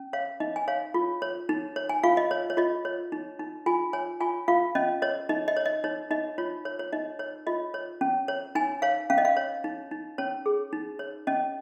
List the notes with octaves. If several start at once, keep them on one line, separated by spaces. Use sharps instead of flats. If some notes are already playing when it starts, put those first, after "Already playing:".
Already playing: C#4
C#5 F5
D#4 D#5
G#5
C#5 F5
F4
C#5
D#4
C#5
G#5
F4 F5
D#5
C#5
C#5
F4 D#5
C#5
D#4
D#4
F4 G#5
C#5 G#5
F4 G#5
F4 F5
C#4 D#5
C#5 D#5
D#4 D#5
D#5
C#5
D#5
D#4 C#5
D#4 D#5
F4 C#5
C#5
C#5
D#4 D#5
C#5
F4 D#5
C#5
C#4
C#5
D#4 G#5
C#5 F5
C#4 F5
D#5
F5
C#5
D#4
D#4
C#4 C#5
G#4
D#4
C#5
C#4 D#5